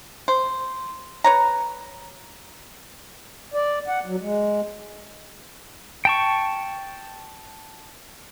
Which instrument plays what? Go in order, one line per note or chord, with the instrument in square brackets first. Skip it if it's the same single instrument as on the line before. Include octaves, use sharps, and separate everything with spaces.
[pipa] C5
B4 C#5 A#5
[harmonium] D5
F#5
F#3
G#3
[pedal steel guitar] G5 A5 C#6